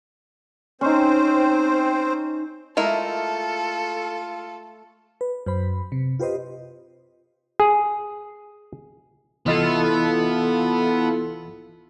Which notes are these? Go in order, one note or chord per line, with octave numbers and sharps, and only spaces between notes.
C4 C#4 D#4 C5
G#3 A3 E4 F4 A4 A#4
B4
F#2 C5 B5
C3
F4 G4 B4 C5 D#5
G#4
C2 E3 B3 E4 F4 A4 D#5